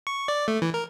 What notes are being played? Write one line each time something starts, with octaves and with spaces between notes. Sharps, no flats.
C#6
D5
A3
E3
A#4